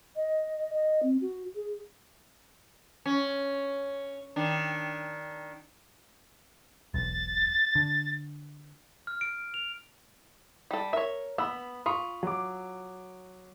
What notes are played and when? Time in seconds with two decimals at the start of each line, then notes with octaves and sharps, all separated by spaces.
0.16 D#5
0.74 D#5
1.02 C4
1.21 F#4
1.55 G#4
3.06 C#4
4.36 D#3 D4
6.94 E1 B1 A6
7.75 D3
9.07 F6
9.21 D7
9.54 F7
10.71 G3 A4
10.93 A#4 C#5 E5
11.38 B3 B5 E6
11.86 F4 B5 C#6 D#6
12.23 F#3 D6